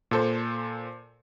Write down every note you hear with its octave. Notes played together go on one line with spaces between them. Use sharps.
A#2 A4 C5